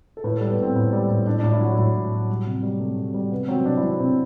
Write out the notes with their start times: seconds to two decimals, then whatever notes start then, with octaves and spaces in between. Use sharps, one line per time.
0.17 A4
0.24 A2 B4
0.37 A4
0.41 G3
0.50 B3
0.59 A2 C4
0.76 A2
0.93 G3
1.10 A2
1.26 A2 D4
1.40 D4
1.43 A2
1.52 E4
1.60 F#3 F#4
1.78 A2 E4
1.95 A2
2.12 F#3
2.29 G3
2.47 C3
2.63 G3
2.80 C3 A3
2.97 C3
3.14 G3
3.32 C3 B3
3.48 F#3 C4
3.65 C3 D4
3.77 E4
3.83 F#3 D4
4.00 C3 C4